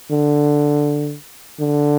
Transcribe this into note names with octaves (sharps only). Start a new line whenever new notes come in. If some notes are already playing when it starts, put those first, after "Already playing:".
D3
D3